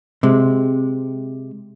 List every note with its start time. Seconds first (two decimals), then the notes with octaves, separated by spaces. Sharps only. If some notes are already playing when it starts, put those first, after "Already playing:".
0.23 C3 G#3